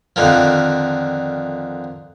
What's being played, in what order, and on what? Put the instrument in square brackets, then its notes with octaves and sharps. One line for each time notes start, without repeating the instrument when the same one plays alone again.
[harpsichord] F2 D3 D#3 F3